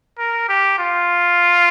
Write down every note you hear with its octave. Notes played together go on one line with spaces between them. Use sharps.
A#4
G4
F4